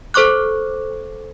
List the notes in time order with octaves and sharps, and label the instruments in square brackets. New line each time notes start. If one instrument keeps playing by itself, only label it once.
[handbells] A4 C5 C#6 D6 F#6